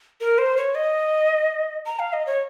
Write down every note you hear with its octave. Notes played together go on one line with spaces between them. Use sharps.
A#4
C5
C#5
D#5
A#5
F5
D#5
C#5